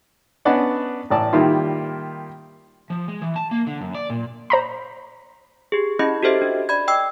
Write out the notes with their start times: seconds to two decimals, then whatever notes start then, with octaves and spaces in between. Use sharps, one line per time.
0.45 B3 C#4 D4 D5 D#5 F#5
1.10 A1 A2 D5 A5
1.33 D#3 G3 A#3 E4 F4
2.90 F3
3.08 G#3
3.22 E3
3.36 A5
3.51 A#3
3.67 D3
3.81 F#2
3.95 D5
4.10 A#2
4.50 C5 A#5 B5
5.72 G4 G#4
5.99 C#4 E4 G#4 D#5 B5
6.23 F#4 G4 A4 C5 D#5 E5
6.42 D4
6.69 D5 B5 G#6
6.88 D#5 G5 D6 E6